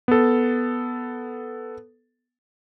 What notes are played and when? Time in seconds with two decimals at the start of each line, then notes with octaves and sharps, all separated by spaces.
0.08 B3 A4